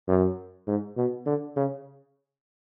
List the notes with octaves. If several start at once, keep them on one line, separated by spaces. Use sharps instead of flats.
F#2
G#2
B2
D3
C#3